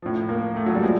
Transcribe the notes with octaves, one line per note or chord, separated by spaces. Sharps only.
A2 F3
A#3
A3
F#3
G3
F3 G#3